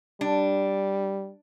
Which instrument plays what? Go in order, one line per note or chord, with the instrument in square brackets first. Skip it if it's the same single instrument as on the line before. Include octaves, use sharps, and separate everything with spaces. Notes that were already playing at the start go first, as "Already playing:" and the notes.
[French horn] G3 [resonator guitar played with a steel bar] D4